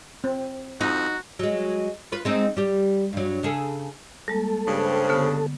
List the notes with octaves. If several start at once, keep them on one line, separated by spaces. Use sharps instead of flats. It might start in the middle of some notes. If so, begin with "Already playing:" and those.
C4
F2 D#4 F#4
F#3 G#3
F4 B4
G#3 C4 D#4
G3 G4
G2 F#3
C#3 G#4 A4
G3 G#3 A#3 A4
G2 C#3 G4 C5
D3 B3